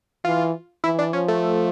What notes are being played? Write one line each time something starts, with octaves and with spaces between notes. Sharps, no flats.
E3 F4
E3 E4
D4
F3 C#4
A3